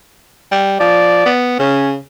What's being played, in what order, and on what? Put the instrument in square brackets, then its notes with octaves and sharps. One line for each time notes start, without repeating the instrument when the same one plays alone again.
[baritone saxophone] G3
[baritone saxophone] F3 [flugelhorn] D5
[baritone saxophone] B3
[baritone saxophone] C#3 [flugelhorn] C#4